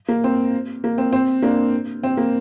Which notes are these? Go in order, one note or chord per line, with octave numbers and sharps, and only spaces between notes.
A#3
C4
A#3
C4
C4
A#3 D4
C4
A#3